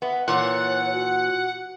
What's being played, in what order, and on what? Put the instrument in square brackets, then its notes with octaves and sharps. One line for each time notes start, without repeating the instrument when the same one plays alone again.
[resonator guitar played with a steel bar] B3 [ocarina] E5
[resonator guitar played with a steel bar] A#2 E3 [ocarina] C#5 [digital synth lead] F#5
[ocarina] F#4